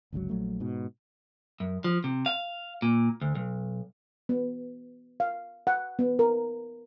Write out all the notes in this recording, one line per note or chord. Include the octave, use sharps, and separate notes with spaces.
G1 C#2 C#3 F#3
A#1 F#3 A3
G#2 B2
F#2
F3
C3
F5
A#2
D2
B1
B3
F5
F#5
B3
A#4